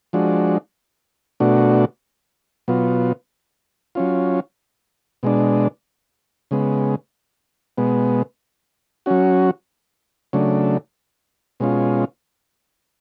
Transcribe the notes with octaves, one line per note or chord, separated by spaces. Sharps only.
F3 G#3 D4 F#4
B2 A3 D4 F#4
B2 F#3 B3 F4
F#3 C#4 F4
B2 G#3 D4
C#3 G#3 B3
B2 G#3 B3
F#3 C#4 F#4
C#3 F#3 A3 D4
B2 G#3 C#4 F4